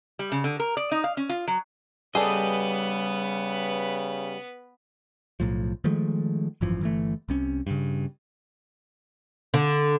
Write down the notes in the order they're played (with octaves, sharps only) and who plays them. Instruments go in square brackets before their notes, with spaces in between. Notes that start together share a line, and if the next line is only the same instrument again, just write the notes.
[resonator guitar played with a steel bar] G3
C#3
D3
A#4
D5
D#4
F5
C#4
F4
F#3
[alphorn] C#3 [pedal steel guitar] G3 D#5 [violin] B3 B4 [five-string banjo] G#4 A4 D5
[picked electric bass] B1 A2 F3
D#3 F3 G#3 A3
G#1 F#2 E3 F3
G1 E3 A3
C2 C3 C#4
G2 C#3
[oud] D3